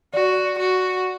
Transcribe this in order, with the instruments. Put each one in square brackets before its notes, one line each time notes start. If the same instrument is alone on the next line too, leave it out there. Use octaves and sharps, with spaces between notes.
[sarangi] F#4 [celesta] D5
[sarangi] F#4